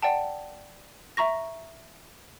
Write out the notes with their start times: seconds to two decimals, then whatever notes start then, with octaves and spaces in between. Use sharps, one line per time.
0.02 D5 F#5 G5 A5
1.17 E5 A#5 C#6 A#6